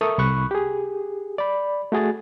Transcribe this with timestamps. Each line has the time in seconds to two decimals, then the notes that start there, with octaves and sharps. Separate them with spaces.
0.01 A4 A#4 E5 C#6 D#6
0.18 C2 B5 C#6 F#6
0.51 G4 G#4
1.38 D5 B5
1.92 A3 F#4 G#4 A6